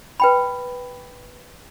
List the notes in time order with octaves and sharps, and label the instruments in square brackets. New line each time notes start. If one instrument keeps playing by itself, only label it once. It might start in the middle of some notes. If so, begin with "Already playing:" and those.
[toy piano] B4 G5 B5